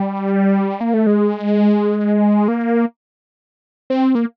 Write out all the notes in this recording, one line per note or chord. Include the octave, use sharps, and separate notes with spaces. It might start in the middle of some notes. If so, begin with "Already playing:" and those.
Already playing: G3
A#3
A3
G#3
A#3
C4
A#3